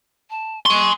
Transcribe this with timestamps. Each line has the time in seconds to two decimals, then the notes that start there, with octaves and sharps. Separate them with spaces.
0.30 A5
0.66 G#5 C6 C#6